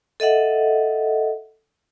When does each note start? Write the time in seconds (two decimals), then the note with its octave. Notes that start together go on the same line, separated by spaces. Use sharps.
0.20 A4 D#5 E5 F#5